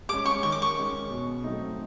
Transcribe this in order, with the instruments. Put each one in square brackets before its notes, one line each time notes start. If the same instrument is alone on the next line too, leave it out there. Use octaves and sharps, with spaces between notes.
[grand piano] G#3 C#4 [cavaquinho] D6
[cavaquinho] C#6
[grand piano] D#3 [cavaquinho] C#6
[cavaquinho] D6
C#6
[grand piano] G#3 C#4
B2
F#3 A3 C4 D#4